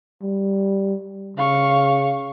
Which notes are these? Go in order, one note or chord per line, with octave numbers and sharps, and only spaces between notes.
G3
C#3 F5 C#6